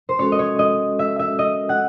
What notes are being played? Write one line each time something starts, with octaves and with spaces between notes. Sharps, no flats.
C5
G#3 C#4 F#4 A4 C#5
D#5
C#5
D#5
E5
E5
D#5
F#5